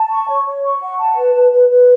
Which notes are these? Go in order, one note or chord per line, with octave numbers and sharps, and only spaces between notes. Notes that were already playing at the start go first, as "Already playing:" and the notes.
Already playing: A5
C#6
C#5
C#5
C#6
F#5
A5
B4
B4
B4
B4